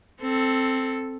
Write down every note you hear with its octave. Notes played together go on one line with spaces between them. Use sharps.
C4 A4